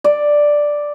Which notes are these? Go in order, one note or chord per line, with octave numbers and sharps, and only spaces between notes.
D5